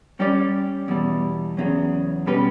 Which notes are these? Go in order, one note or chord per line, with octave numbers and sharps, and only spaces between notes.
G3 C#4 G4 D5
E2 B2 G3
E2 C#3 F#3
B2 G3 C#4 G4 B4